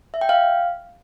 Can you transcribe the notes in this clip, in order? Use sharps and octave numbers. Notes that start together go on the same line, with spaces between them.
E5
G5
F5